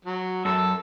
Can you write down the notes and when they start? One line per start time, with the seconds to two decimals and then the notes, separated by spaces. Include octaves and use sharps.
0.05 F#3
0.45 F#2 A5 E6